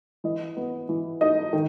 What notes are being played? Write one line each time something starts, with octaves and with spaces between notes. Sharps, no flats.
E3 D#5
B3
E3
D#4 D#5
D#3